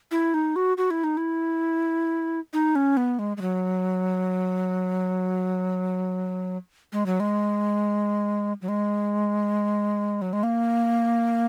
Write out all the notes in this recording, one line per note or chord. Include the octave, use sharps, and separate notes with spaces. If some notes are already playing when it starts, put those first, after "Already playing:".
E4
D#4
F#4
F#4
E4
D#4
E4
D#4
C#4
B3
G#3
G#3
F#3
G#3
F#3
G#3
F#3
G#3
F#3
G#3
A#3